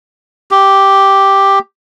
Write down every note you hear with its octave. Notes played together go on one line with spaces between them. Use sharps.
G4